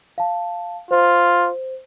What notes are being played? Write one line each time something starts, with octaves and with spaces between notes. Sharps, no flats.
F5 A5
F4 C5